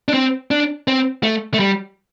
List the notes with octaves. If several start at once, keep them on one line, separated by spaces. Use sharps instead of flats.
D4
C4
D4
C4
A3
A3
G3